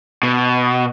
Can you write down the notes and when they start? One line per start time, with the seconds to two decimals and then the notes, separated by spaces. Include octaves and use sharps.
0.23 B2